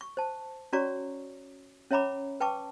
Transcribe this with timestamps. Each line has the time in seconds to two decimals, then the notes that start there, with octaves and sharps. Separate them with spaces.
0.01 C#6
0.17 C5 A5
0.73 C#4 F#4 C#5 D5 A#5 C#6
1.91 C#4 C#5 E5 A#5 B5 D6
2.40 B4 G5 A5 C#6 D6